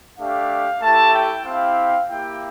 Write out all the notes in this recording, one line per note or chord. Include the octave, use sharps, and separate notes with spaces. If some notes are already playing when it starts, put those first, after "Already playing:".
A3 D4 G4 F5
A3 E4 G4 A5
G5
C4 E4 G4 F5
A#3 E4 G4 G5